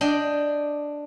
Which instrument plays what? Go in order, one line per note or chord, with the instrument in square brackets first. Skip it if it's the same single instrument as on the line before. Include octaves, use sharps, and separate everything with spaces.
[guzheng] D4 D#5 G5